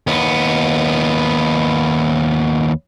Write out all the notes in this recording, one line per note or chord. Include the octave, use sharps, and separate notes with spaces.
D#2 B3